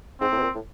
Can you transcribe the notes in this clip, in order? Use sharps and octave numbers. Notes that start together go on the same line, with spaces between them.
G#2 C4
A2
B2
A#2
A2